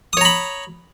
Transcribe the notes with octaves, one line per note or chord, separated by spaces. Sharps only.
C#5 A#5 B5 D#6